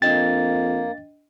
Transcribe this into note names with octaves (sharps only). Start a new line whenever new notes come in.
F2 A#3 D4 D#5 G5 A6